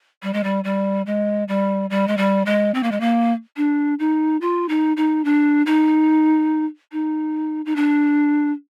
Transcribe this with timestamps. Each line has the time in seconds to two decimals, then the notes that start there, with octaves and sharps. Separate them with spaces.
0.23 G3
0.33 G#3
0.44 G3
0.64 G3
1.06 G#3
1.48 G3
1.90 G3
2.08 G#3
2.17 G3
2.46 G#3
2.74 C4
2.83 A#3
2.92 G#3
3.00 A#3
3.57 D4
3.99 D#4
4.41 F4
4.69 D#4
4.97 D#4
5.25 D4
5.66 D#4
6.92 D#4
7.66 D#4
7.76 D4